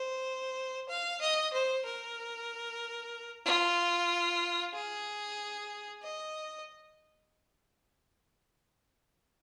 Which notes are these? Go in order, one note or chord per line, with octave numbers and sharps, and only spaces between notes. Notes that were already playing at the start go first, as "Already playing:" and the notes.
Already playing: C5
F5
D#5
C5
A#4
F4
G#4
D#5